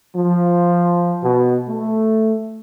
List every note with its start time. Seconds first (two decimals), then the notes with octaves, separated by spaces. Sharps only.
0.16 F3
1.23 B2
1.69 A3